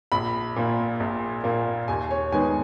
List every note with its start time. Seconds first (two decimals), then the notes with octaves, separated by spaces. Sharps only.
0.12 A#1 B5
0.56 A#2 A#3
1.00 A#1
1.44 A#2 A#3
1.88 D#2 G#5
2.11 C#5
2.32 D#3 G#3 B3 G#5